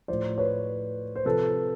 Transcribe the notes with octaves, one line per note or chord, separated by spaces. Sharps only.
A2 F3 C5 D5
B4 C#5
C5
C3 F3 A4 B4